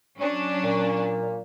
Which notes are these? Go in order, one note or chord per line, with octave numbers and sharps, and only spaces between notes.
F#3 C#4 D4
A#2 A#3